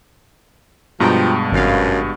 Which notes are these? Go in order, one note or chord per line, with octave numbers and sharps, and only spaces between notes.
G2 B2 F3 G#3 G5 A#5
G#1 F#2 F5